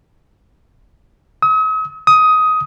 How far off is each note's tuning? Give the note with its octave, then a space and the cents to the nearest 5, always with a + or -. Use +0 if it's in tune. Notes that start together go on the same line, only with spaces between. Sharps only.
D#6 +45
D#6 +15